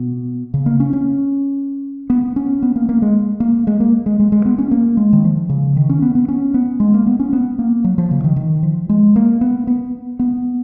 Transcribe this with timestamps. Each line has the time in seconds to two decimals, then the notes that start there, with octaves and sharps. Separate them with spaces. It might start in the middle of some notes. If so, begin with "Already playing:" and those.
Already playing: B2
0.54 C#3
0.66 A#3
0.80 C#4
0.93 C#4
2.10 B3
2.36 C#4
2.62 B3
2.76 A#3
2.89 A#3
3.02 G#3
3.40 A#3
3.67 G#3
3.80 A#3
4.06 G#3
4.19 G#3
4.32 G#3
4.45 B3
4.58 C#4
4.71 A#3
4.97 G#3
5.13 D#3
5.24 F3
5.49 C#3
5.76 D#3
5.89 C#4
6.02 B3
6.15 B3
6.28 C#4
6.54 B3
6.80 G#3
6.94 A#3
7.07 B3
7.20 C#4
7.33 B3
7.59 A#3
7.84 F#3
7.98 F3
8.11 C#3
8.24 D#3
8.36 D#3
8.63 F3
8.89 G#3
9.16 A#3
9.41 B3
9.67 B3
10.19 B3